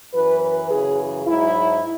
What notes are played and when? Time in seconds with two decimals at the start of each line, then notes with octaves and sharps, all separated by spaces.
0.14 F#2 E3 B4
0.42 B4
0.71 F#2 C#3 E3 G#4
1.26 G#2 F#3 E4